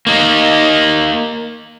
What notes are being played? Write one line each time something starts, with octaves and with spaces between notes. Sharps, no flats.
A#3 D#4